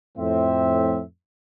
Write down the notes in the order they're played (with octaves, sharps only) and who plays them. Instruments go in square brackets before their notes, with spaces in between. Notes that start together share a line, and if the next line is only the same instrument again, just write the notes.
[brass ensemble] F2 A2 C4 E5